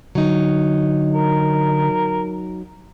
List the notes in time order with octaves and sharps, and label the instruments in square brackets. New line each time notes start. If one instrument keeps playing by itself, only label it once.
[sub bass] D3 [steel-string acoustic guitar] F#3 D#4
[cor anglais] A#4